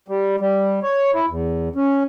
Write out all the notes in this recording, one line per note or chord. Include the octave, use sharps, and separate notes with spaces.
G3
G3
C#5
E4
E2
C#4